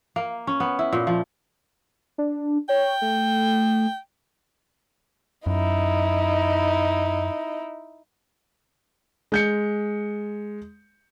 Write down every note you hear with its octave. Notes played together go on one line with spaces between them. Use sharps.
A#3
C#4
B3
E4
A#2
F3
D4
C#5 G5
A3
F#2 D#4 E4
G#3 G6 C#7